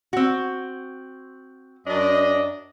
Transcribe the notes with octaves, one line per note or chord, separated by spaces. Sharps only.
C4 F#4
F#2 D4 D#5